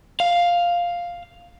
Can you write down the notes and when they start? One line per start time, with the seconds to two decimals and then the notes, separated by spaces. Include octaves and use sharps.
0.20 F5